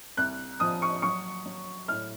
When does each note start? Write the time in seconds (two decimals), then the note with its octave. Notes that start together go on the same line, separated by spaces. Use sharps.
0.17 C2 F#6
0.60 F3 D#6
0.82 C#6
1.02 F#3 C#6
1.46 F#3
1.88 A2 F6